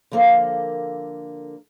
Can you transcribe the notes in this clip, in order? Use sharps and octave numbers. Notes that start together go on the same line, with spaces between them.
D3 F3 A#3 A4 A#4